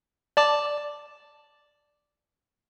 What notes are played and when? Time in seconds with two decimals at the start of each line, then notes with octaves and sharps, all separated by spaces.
0.37 D5 A5 D6